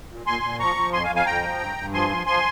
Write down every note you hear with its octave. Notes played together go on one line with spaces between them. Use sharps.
A#2
A#2 G#5 C6
A#2
F3 A#5 C#6
F3
F2 G#5 C6
F5 G#5
F2
F5 G#5
F2 G5 A#5
F3
G2
G2
F3 G#5 C6
F3
F3 G#5 C6